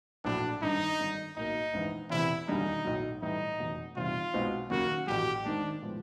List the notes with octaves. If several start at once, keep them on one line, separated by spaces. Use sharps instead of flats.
A#1 A2 F#3 D4
G#1 G2 D3 D#4
G#1 G2 D3
B1 A2 F#3 A#3 D#4
A#1 G#2 E3
E2 C3 E3 E4
E1 D#2 D3 G3 D#4
B1 A2 F#3
A2 E3 G3 D#4
F1 E2 B2 F#3
E2 C3 D#3 G3 F4
B1 B2 G#3 C4 D#4
D#2 C#3 F#3 A#3 F#4
A1 A2 F#3 G4
G#1 G#2 D#3 G#3 D4
A2 F3 G#3 B3